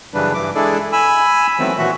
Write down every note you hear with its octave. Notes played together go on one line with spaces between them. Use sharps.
F#2 C#3 E3 G3 D4 B4
G2 E3 D6
G#3 D4 E4 G#4 A4 D5
G#5 B5 E6
D#3 E3 F#3 A3 B3 C4
A#2 E3 F#4 E5